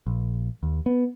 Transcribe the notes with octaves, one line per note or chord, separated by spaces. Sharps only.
A#1
D#2
B3